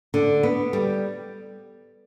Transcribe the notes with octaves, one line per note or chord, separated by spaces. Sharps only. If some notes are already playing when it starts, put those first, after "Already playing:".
D3
B3
G3